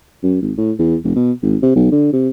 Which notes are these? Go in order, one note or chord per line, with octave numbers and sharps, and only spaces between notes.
F#2
G#1
A2
E2
F1
B2
G#1
C3
B1
D3
C3